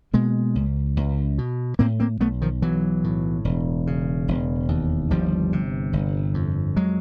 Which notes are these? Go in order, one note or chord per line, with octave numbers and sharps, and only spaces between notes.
B2 G#3 A#3
C#2
C#2
B2
A2 A#3 C4
A#3 C4
B1 A3 B3
D#3 F3
B1 E3 F#3
A2
E1
C#3
E1
D#2
G1 F3 G3
C3
G1
F2
F#3 G#3